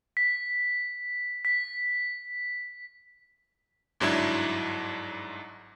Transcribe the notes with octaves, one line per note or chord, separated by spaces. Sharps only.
B6
B6
G1 G#2 F#3 D4 E4 G#6